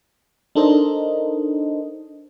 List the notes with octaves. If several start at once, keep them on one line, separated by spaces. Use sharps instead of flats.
D4 D#4 A4 A#4 C5 D#5